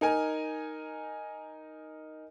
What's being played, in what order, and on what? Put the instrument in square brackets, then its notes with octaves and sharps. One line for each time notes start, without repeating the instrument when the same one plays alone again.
[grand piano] D#4 A#4 G#5